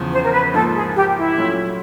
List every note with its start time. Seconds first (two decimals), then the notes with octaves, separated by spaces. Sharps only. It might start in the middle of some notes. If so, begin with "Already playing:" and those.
Already playing: E2 C#3 F3
0.12 C5
0.24 A#4
0.32 B4
0.54 G#2 F3 A#3 A4
0.75 G#4
0.96 G4
1.16 E4
1.36 A#2 F#3 A3 C#4 F4